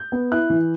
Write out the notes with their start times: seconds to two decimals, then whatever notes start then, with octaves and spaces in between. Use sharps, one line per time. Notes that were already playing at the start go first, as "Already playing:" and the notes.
Already playing: G6
0.12 B3
0.32 E4 F#6
0.50 E3